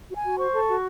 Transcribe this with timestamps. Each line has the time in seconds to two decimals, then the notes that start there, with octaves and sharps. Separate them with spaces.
0.09 F#4
0.16 G#5
0.24 F#4
0.38 C5 C#6
0.53 A4
0.68 F#4